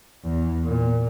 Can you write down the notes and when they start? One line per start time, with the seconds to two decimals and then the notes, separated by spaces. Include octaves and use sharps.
0.24 E2
0.64 A#2